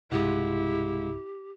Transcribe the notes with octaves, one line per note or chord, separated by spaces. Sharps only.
B1 G2 C3 G#3 E4 F4 G4 F#5